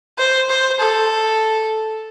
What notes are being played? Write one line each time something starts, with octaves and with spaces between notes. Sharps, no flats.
C5
C5
A4